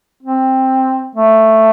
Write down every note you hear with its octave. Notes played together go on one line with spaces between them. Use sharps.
C4
A3